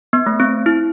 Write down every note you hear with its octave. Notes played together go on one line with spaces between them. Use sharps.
B3
A3
C4
E4